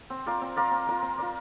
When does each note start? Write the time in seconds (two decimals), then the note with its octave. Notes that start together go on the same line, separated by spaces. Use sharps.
0.10 C4
0.26 F4 A#4 D5
0.41 C4
0.56 F4 A#4 D5
0.71 C4
0.87 F4 A#4 D5
1.02 C4
1.18 F4 A#4 D5